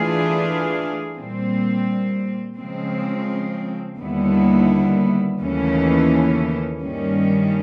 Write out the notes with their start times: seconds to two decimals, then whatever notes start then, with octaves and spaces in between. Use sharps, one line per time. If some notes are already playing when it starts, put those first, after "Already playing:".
Already playing: E3 A3 D4 F4 G#4
1.16 A#2 G3 C4
2.56 C#3 F3 G#3 C4
3.98 D#2 D3 G3 B3 E4
5.40 D#2 C#3 E3 A3 C#4
6.81 G2 D#3 G3 A#3 C#4